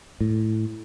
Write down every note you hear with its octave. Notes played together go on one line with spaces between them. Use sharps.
A2